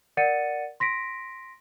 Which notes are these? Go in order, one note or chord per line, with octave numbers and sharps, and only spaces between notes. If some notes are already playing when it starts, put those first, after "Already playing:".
A#4 D5 F#5 A6 C#7 D#7
C6 A#6 B6 D7